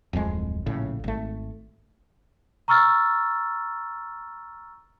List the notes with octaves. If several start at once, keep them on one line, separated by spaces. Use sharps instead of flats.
D1 F2 F3 G#3
A#1 A2 C#3
G#1 A3
A#5 C#6 E6 F6 A6